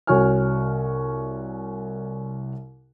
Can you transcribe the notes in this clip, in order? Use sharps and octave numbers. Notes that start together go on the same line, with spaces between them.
C2 F#4 C#5 G#5 F6